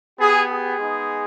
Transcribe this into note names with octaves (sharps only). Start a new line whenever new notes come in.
B3 G4 G#4
G#4
G#3 B3 D#4